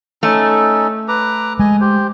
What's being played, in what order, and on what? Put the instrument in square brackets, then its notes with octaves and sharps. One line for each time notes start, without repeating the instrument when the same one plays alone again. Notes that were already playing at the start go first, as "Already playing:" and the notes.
[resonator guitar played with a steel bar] A3 [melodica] C#4 D#4 A4
[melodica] B4 A#5 D6
[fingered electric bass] G#3 [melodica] D#5 G#5
[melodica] G4 C5